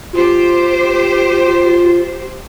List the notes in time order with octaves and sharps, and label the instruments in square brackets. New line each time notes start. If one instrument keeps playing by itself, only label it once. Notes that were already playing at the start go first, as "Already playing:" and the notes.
[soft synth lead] F4 [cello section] G4 C5